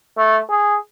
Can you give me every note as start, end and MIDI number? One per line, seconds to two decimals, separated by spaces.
0.18 0.38 57
0.50 0.76 68